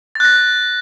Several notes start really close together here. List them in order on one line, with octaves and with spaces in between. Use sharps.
A6 F#6 A#6